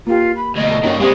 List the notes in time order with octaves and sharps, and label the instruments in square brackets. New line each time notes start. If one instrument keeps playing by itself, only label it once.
[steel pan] A#3 G4 [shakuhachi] F4
[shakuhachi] B5
[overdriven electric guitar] D2 B2 [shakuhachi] D#5
[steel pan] A4
[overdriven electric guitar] G2 D#3 [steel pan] A#3 C#4 F#4
[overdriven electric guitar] C#3 G#3 [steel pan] G3 C4 D#5 [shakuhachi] F#5